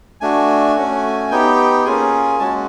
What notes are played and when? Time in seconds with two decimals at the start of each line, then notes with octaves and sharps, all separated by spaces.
0.21 A3 D4 F#4 G#5
0.76 A3 C#4 F#4
1.31 B3 D#4 G4 G5
1.85 A#3 C#4 F4 G#4 G#5
2.39 G#3 C#4 F#4 A5